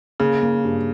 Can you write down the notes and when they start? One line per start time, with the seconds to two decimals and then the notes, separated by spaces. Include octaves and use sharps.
0.20 C#3 A#3
0.42 A#3
0.64 G2